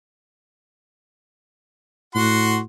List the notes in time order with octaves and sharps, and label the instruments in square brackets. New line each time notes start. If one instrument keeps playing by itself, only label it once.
[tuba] A2 [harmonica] F#4 F#5 C6